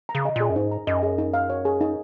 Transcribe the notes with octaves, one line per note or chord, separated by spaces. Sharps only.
A#5
C#3
D#5
A#2 G#4
F#2
G#2 D#4
A#5
F#2 D#5
G#4
D#4
F5
C#5
G#4
D#4